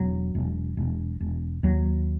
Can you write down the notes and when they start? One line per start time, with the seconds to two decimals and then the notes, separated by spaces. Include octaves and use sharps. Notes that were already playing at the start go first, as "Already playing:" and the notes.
Already playing: E1 F#3
0.35 E1
0.77 E1
1.20 E1
1.63 D#2 F#3